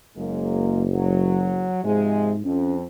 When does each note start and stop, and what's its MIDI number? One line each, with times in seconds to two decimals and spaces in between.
0.17 1.73 30
0.17 0.84 54
0.17 0.84 56
0.17 0.84 58
0.91 1.82 54
1.84 2.43 44
1.84 2.33 48
1.84 2.33 53
1.84 2.33 56
2.45 2.83 41
2.45 2.75 61